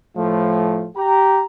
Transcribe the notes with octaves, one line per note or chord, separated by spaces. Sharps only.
A2 F3 A3
G4 A#5